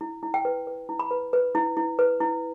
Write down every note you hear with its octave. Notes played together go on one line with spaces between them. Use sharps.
E4
E4
G5
B4
B4
E4
B5
B4
B4
E4
E4
B4
E4